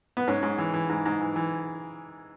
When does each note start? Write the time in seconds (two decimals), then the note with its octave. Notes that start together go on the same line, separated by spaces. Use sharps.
0.17 B3
0.28 G#2 C#4
0.43 G#2
0.58 E3
0.74 E3
0.90 G#2
1.06 G#2
1.21 E3
1.36 E3